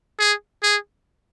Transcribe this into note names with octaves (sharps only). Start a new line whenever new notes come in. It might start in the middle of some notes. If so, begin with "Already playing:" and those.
G#4
G#4